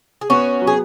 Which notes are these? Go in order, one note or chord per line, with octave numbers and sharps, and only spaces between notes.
G#4
B3 C#4 F#4
F#3
G#4